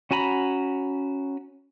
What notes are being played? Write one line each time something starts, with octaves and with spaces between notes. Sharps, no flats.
C#4 F#4 G#5 A#5 B5